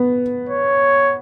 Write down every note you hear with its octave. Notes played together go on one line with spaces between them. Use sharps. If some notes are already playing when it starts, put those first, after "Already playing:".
Already playing: B3
C#5